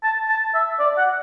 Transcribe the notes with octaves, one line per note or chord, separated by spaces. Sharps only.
A5
A5
E5
D5
F#5